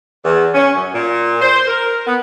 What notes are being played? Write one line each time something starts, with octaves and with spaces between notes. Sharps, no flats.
E2
C#4
F#2
A#2
C5
A#4
B3